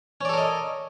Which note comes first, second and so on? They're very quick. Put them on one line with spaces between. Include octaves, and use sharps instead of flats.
C#4 D5 A4 A#4 D#5